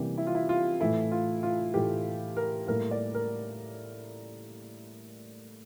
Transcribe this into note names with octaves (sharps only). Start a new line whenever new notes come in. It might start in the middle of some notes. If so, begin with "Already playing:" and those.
Already playing: C3 E3 G3 A#3 G4
E4
F4
E4
F4
A2 E3 A3 E4
F4
F4
A2 E3 A3 G4
A#4
A2 G3 A#3 A#4
D5
A#4